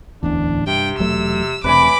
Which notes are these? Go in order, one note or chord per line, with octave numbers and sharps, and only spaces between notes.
D1 A1 E2 D4
G2 C3 G5
E1 F#3 A3 E6
E1 C3 A3 B4 D5 G#5 B5 D6